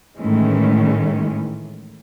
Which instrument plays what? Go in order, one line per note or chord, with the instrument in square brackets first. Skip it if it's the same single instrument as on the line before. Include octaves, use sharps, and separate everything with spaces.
[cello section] A2 D#3 E3 G#3 C#4